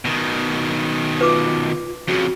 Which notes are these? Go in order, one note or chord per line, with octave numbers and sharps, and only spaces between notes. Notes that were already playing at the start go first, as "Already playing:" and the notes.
B2 D#3
F4 B4 D6 E6
F2 C#3 F#4